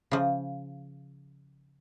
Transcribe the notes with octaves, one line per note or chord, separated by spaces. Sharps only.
C#3 F3